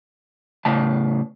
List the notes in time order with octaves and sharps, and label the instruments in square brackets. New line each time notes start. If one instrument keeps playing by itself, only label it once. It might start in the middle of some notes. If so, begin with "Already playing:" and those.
[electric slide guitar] A2 C#3 A5